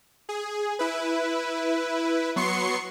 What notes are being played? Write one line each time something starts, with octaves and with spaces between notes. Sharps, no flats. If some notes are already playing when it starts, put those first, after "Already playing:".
G#4
E4 B4
F#3 B3 C6 C#6 C7 C#7